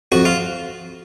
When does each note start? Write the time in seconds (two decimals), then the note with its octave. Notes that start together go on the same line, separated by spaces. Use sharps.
0.12 F2 F#4
0.25 F4